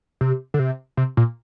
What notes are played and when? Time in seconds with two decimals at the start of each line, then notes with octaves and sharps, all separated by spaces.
0.21 C3
0.54 D3
0.59 C3
0.97 C3
1.17 A#2